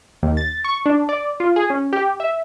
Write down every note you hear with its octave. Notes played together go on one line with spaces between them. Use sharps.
D#2
A6
C#6
D4
D5
F4
G#4
C#4
G4
E5